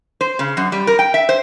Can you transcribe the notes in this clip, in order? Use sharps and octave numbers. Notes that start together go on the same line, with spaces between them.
C5
C#3
F#2
G3
A#4
G5
E5
C5